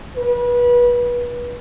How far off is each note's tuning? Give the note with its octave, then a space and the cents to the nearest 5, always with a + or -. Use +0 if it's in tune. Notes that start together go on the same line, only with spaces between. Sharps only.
B4 -30